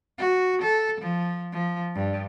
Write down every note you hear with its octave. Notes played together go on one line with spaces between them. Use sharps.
F#4
A4
F3
F3
G2